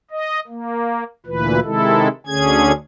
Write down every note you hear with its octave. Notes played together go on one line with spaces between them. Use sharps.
D#5
A#3
D2 A#2 E3 B4
C3 D#3 G#3 E4 A4
D2 D3 C#4 G#4 G#6